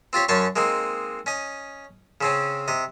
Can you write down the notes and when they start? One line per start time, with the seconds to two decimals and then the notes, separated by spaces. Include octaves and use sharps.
0.13 C4 F4 G4 C#5
0.28 F#2 C#4 C#5 A5 C6 C#6
0.56 G#3 A#3 C4 D#4
1.26 C#4 D#5
2.21 C#3 C4 C#4
2.68 C3 D#5